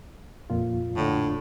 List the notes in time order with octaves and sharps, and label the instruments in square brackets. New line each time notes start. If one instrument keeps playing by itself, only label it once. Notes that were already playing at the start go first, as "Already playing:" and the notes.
[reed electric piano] F2 A#2 F4
[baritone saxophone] A2 [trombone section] D3